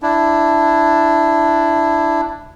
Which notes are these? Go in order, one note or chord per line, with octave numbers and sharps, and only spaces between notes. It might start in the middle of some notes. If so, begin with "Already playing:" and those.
D4 E4